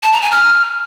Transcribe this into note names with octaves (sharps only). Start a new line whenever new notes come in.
A5
A#5
G#5
F6